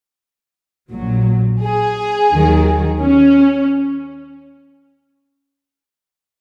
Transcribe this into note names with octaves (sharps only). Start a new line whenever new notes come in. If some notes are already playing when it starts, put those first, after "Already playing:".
A#1 A#2 F#3
G#4
D#2 D#3 F#3
C#4